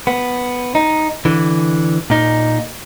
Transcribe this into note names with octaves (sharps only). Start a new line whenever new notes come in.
B3
D#4
D3 E3
A#2 D#4